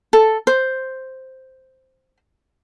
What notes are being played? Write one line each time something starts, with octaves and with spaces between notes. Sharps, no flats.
A4
C5